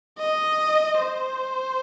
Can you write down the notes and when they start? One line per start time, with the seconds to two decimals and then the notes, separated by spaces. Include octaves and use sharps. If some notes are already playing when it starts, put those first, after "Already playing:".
0.19 D#5
0.98 C5